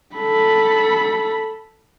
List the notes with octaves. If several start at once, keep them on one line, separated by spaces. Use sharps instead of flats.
A4 B5